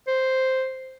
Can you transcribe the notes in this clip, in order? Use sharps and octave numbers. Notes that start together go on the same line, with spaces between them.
C5